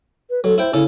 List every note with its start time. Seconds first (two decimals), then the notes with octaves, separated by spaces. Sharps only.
0.30 B4
0.44 F#3 A4
0.58 E4 C5 G5
0.73 C#3 E4 A4